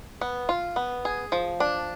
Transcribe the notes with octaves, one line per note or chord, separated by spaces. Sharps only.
B3
F4
B3
G#4
F3
D4